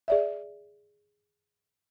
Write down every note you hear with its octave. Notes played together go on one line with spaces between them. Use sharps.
G#4 D5 E5